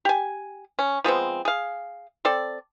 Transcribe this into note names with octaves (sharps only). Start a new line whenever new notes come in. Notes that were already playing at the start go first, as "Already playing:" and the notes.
G4 G#5
C#4
F3 G#3 B3 C4
G#4 F5
C4 A4 D5